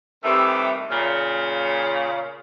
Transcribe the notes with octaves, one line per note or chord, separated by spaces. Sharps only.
C3 D#3 E3 G3 A3 E5
A#2 C#3